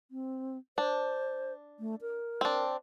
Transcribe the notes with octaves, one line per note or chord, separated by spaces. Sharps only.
C4
D4 C5
A3
A#4
C4 D4